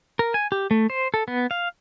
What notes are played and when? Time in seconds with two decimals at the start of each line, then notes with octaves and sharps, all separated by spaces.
0.19 A#4
0.34 G#5
0.52 G4
0.71 A3
0.90 C5
1.14 A4
1.28 B3
1.51 F5